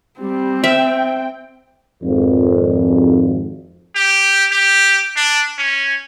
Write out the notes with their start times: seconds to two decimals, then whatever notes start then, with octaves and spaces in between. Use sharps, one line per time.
0.20 G3 C4
0.64 C5 E5 G5
2.03 G#1 F2
3.95 G4
4.51 G4
5.16 D4
5.58 C#4